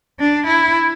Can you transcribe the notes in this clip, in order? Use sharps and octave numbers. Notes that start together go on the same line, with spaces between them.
D4
E4